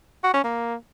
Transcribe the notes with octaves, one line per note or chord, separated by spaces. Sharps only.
F#4
C#4
A#3